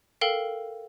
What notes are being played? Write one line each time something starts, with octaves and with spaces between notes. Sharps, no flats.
A4 A#4 F5 G5